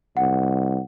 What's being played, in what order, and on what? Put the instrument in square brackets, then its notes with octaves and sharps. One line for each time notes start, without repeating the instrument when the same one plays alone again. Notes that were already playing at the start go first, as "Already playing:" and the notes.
[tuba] C2 [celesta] F#5